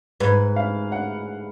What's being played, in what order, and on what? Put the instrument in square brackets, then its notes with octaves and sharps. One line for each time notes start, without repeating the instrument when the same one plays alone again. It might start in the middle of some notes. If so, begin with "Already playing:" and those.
[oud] G#2 [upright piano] B4
[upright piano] F5
F#5